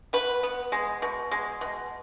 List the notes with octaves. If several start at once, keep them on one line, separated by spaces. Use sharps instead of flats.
B3 B4
B3
G#3
B2
G#3
B2